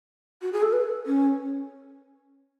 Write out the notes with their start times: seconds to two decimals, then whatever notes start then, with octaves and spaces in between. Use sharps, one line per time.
0.42 F#4
0.52 G#4
0.62 A4
0.72 B4
1.06 C#4